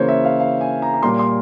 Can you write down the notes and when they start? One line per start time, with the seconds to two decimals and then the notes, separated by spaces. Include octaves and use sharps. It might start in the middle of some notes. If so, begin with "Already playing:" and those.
Already playing: C#3 E3 A#3 C5 C#5
0.09 E5
0.25 F5
0.40 F5
0.61 G#5
0.82 A#5
0.94 A#5
1.03 A#2 G3 A#3 C6
1.19 C6